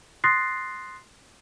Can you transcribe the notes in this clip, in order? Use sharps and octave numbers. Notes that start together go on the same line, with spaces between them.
C6 D#6 F#6 A6 A#6 C7